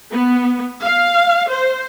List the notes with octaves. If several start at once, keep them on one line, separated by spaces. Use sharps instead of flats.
B3
F5
C5